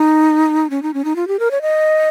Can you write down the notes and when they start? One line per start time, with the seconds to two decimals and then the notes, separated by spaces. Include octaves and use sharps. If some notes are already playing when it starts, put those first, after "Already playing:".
Already playing: D#4
0.70 C#4
0.83 D#4
0.94 C#4
1.05 D#4
1.16 F4
1.28 G4
1.39 A#4
1.51 C#5
1.62 D#5